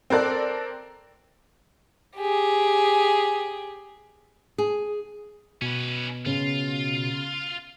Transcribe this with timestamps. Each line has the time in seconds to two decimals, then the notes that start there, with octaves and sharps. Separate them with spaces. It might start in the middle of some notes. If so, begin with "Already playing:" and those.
0.10 C4 A4 A#4 D5 F#6
2.17 G4 G#4
4.58 G#4
5.62 B2 C#4 B4
6.26 C#3 F4